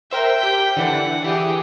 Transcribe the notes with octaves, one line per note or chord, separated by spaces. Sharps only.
A#4 C5 E5 G5
G4 G6 B6
D3 E3 D4 F#5
E3 G4 G#4